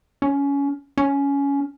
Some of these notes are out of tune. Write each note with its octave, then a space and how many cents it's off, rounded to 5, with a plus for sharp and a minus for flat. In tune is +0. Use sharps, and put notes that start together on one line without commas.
C#4 +20
C#4 +15